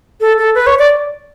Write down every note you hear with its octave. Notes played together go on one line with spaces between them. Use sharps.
A4
A4
B4
C#5
D5